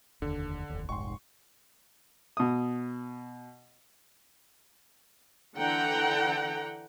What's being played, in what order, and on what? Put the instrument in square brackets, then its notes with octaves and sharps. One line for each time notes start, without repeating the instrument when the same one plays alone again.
[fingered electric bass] F1 D#2 [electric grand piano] D3
[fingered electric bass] F1 D#2
[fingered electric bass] F1 A#1 G#2 [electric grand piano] C6 C#6
[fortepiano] B2 D#6
[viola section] D3 E3 F#5 G5 A#5